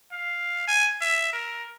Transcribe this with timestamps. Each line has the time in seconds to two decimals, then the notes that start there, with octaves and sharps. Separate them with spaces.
0.12 F5
0.67 G#5
1.01 E5
1.33 A#4